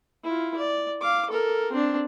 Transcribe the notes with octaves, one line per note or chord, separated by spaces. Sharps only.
E4 F4
D5
F5 D6
A4 A#4
C4 D4